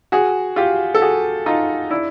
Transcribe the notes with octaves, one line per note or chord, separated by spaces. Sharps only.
F#4 G#4
F4 G4
A4
F#4 G#4
D#4 F4
D4 E4